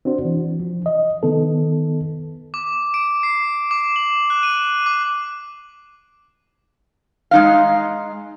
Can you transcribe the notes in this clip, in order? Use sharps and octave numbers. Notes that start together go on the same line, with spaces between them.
C4 D4 F#4 C5
E3
F3
D#5
D#3 B3 A4
D6
D7
C7
D6
F#7
F#6
D#7
D6
G#3 D#4 F5